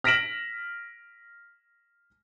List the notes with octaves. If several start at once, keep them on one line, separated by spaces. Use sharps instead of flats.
F6 A#6 B6 D7 E7 F#7